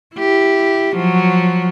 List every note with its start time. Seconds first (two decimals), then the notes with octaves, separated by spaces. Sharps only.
0.16 E4 G4
0.96 F3 F#3